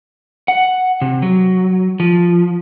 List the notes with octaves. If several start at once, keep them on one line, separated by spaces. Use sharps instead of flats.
F#5
C3
F#3
F3